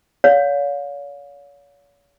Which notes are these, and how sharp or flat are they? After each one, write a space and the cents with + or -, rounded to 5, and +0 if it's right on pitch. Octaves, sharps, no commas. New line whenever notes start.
C#5 +40 F5 +30